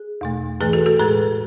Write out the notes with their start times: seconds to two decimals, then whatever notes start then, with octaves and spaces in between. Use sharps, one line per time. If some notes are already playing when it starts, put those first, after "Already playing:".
Already playing: G#4
0.21 E2 B2 A3
0.60 G#2 E3 A3 G#4 B4
0.73 F#4 A4
0.86 F#4 A4
0.99 A2 G#3 G#4 B4